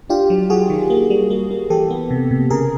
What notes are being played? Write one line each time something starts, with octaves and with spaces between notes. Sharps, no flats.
D4 F4 G4
F#3
F#3 F#4 G#4
D#3
A#3
G3
A#3
A#3
E3 G4 A4
B3
C3
C3
C#3 G#4 A#4